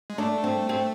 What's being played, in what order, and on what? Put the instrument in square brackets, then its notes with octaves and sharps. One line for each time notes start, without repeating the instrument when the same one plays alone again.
[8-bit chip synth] G#3
[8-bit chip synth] A3 [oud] D4
[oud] C4
C4